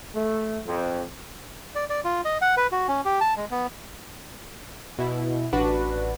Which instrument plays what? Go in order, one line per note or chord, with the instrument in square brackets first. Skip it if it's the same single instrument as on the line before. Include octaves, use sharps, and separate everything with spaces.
[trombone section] A3
F2
[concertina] D5
D5
F4
D#5
F#5
B4
F#4
C#4
G4
A5
G#3
B3
[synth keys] B2 E4
A1 D4 F#4 B4